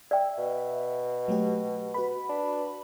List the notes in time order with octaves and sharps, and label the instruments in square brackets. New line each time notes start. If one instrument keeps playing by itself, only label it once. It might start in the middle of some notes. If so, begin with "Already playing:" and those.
[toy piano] D5 G5 [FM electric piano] E5
[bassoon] B2
[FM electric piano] F#3 A3 G4
F#4 B4 B5
[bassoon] D4